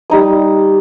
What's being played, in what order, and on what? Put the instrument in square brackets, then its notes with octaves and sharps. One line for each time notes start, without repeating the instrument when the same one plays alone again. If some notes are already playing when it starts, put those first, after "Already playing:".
[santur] G3 D#4 D#6